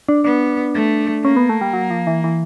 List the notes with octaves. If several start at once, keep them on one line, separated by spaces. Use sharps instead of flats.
D4
B3 D4
A3
A#3 C#4
B3
A3
G3
F#3
F3
E3
E3